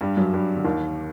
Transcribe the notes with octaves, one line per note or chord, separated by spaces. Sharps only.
G2 G3
F#2 F#3
G2 G3
D3
D#2 D#3